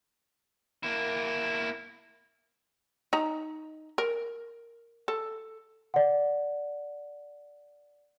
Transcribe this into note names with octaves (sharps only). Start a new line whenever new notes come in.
A#3 E4
D#4 A#5
A#4
A4
D5 F#5